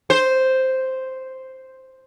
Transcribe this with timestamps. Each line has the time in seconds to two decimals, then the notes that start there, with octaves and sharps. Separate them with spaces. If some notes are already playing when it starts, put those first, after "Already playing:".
0.10 C5